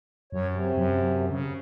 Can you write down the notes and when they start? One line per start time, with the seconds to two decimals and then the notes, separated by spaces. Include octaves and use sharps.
0.32 F#2 C#5
0.50 C3
0.77 F#2
1.30 C#3